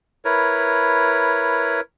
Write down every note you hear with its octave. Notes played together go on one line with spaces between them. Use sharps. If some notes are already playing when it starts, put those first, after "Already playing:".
E4 A#4 B4 C#5